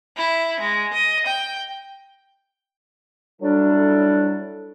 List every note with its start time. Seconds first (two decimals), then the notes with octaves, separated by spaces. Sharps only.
0.17 E4
0.60 G#3
0.94 D#5
1.26 G5
3.41 F#3 G3 D4 E4 A4